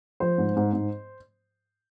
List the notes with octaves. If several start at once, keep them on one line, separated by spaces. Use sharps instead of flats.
F3 C5
G#2
G#2
G#2